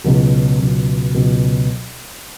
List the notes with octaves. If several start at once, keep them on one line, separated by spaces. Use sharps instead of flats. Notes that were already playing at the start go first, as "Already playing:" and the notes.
C#2 B2 F#3
C#2 B2 F#3
C#2 B2 F#3